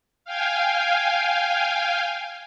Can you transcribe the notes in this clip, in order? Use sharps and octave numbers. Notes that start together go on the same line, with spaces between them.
F5 G5 G#5